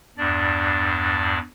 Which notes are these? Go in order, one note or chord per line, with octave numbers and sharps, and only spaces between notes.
E2 G2 D4 D5